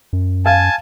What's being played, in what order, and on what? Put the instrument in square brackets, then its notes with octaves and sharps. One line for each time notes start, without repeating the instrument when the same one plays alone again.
[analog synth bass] F#2
[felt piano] F5 [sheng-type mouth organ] G#5 A5